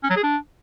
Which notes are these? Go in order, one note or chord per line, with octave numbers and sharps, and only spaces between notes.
C#4
F#3
G#4
D4